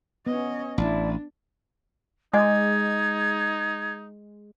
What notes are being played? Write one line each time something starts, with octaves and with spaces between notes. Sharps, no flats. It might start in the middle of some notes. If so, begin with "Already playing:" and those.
B3 C#4 D#5
A1 D4 E4 D5 A5
G#3 D#4 D#5 G#5 D6 G#6